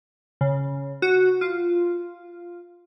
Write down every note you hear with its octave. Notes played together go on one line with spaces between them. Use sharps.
C#3
F#4
F4